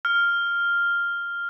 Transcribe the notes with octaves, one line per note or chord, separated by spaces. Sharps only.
F6